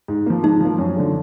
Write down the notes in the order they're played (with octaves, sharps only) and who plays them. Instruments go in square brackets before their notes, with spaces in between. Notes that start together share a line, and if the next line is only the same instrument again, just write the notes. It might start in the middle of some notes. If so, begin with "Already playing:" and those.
[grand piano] G#2
F3 A#3
[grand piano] G#2 [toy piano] D#4
[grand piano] F3 A#3
F#2
D3 F3